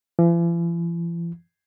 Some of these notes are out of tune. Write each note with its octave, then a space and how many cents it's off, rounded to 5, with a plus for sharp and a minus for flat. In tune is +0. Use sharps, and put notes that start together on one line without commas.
E3 +45